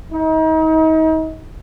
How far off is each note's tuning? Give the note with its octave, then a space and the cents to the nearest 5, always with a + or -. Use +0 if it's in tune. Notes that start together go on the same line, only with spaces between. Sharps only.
D#4 +35